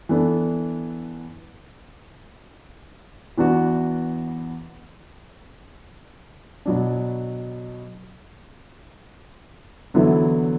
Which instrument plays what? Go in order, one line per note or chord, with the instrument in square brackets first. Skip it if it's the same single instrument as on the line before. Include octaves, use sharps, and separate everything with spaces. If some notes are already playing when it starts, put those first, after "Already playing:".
[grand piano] E3 B3 D4 A4
E2 E3 B3 D4 F#4
B2 F#3 D4
E2 D3 F#3 B3 E4